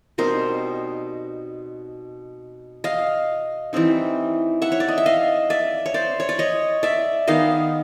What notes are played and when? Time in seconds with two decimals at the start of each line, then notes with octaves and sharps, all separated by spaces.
0.18 B2 G3 C4 D#4 A#4 C5
2.84 D#5 F5
3.73 E3 G3 C4 D#4
4.62 E5 F#5
4.72 C#5
4.80 D5
4.88 D#5
4.98 E5
5.06 D#5 F5
5.50 D5 E5
5.86 C#5
5.94 C5 D5
6.20 C#5
6.29 D5
6.39 C#5 D#5
6.83 D5 E5
7.27 D#3 G#3 B3 D#4 D#5 F5